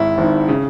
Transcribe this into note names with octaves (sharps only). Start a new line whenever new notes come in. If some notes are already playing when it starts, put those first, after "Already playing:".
Already playing: G#1 G#2 D#3 E4
G#1 G#2 D#3
C#3